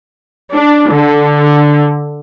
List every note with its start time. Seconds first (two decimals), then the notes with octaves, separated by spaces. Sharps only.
0.52 D4
0.88 D3